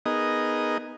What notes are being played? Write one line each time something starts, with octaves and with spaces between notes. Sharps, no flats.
B3 D#4 G#4 A#4 D#5